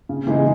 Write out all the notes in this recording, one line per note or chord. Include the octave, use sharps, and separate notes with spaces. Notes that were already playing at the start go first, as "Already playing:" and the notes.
C#3
E3 G#3 D#4 G#4